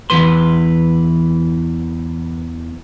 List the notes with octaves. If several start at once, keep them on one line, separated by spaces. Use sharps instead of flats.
E2 C3 E3 B4 C6